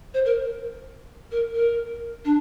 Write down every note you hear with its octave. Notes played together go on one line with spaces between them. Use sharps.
C5
A#4
A#4
A#4
D4